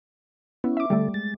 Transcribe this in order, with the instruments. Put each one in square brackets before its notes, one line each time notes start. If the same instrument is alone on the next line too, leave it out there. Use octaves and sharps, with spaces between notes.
[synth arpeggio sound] B3 [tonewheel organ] C#4 E4
[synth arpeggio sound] E5 D6
[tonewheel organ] D3 A4 [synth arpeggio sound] G3 A3
[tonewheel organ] G#3 A6